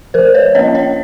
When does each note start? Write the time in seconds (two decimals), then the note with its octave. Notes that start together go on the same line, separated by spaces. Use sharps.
0.14 F3 A#4 C5
0.34 B4 C#5
0.55 A#3 C#4 C#5 D#5
0.75 C#5 D#5